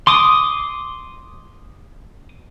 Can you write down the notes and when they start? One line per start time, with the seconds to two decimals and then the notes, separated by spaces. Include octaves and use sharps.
0.07 C6 D6 D#6